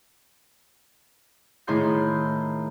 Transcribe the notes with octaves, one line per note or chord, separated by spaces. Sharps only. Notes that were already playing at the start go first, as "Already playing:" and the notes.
A2 D#3 E4 G#4 C6 G6